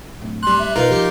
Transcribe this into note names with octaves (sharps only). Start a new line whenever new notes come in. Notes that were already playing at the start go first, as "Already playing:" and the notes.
D1
G3 C6 F#6
E5
B2 D#4 F4 A#4 B4
F3 G4